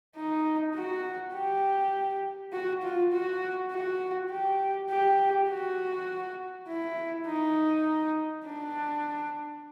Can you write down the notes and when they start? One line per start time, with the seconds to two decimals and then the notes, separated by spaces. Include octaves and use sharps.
0.16 D#4
0.75 F#4
1.35 G4
2.52 F#4
2.82 F4
3.12 F#4
3.71 F#4
4.31 G4
4.90 G4
5.49 F#4
6.68 E4
7.27 D#4
8.45 D4